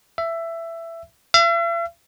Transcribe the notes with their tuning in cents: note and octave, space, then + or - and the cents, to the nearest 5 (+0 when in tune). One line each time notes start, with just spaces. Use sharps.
E5 +15
E5 +45